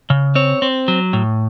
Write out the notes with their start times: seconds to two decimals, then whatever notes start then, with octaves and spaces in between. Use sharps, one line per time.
0.10 C#3
0.35 C4 C#5
0.62 C4
0.88 F#3
1.13 A2